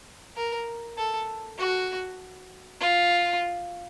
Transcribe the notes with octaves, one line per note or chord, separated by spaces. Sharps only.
A#4
A4
F#4
F4